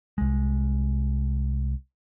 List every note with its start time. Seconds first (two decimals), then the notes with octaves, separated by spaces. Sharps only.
0.18 C2 G#3